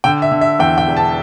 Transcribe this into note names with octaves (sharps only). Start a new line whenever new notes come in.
D3 G5
E5
D3
E5
E2 G5
G5
E1
A5